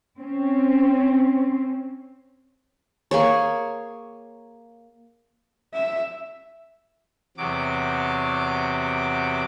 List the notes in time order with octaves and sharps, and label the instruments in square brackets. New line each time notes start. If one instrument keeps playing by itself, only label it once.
[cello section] C4 C#4
[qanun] A#3 G#4 C#5
[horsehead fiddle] E5
[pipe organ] E2 C3 F#3 D6